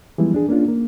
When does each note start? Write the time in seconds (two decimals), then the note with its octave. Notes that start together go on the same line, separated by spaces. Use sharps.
0.18 E3 F3 G3 G#3 B3 E4
0.34 D4 G#4
0.49 A#3 C#4 D4 F4
0.69 A#3